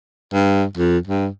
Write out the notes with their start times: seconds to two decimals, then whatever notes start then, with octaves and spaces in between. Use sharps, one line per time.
0.33 G2
0.77 F2
1.07 G2